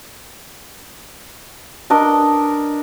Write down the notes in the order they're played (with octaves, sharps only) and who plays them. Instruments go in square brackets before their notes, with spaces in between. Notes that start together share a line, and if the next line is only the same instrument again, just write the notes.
[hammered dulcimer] D4 A#4 D#5